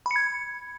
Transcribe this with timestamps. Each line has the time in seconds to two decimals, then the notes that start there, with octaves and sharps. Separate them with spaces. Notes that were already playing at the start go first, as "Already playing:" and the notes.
0.06 B5
0.11 C#7
0.16 G#6